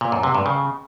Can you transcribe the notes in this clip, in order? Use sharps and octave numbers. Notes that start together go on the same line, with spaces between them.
A#2
F#2
C3
G2
C#3